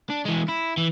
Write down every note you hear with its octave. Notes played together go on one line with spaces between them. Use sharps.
D4
E3 G#3
E4
E3